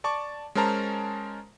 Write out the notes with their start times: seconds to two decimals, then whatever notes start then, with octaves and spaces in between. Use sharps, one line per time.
0.04 D5 A5 C#6 D6
0.55 G#3 C#4 A#4 C5 A5 A#5